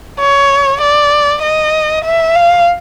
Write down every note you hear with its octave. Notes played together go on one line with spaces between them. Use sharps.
C#5
D5
D#5
E5
F5